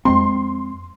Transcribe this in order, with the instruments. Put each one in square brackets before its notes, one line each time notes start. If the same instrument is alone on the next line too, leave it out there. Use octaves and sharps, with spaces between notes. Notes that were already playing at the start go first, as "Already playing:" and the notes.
[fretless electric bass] F2 G#3 C4 [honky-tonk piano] C6